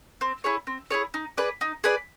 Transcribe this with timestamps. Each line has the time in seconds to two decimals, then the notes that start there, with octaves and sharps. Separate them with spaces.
0.21 C4
0.44 E4 G#4 C#5
0.67 C4
0.91 E4 G#4 C#5
1.14 D#4
1.37 G#4 B4 D5
1.61 D#4
1.84 G#4 B4 D5